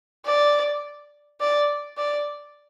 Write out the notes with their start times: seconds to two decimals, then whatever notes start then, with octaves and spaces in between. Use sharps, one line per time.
0.26 D5
1.40 D5
1.98 D5